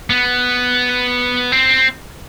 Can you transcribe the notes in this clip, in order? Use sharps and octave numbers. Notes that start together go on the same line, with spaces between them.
B3
C4